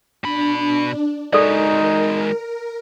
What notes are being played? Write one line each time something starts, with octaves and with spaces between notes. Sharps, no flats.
B2 D4 B5
G#3 D#4 F#4 A4 A#4 D5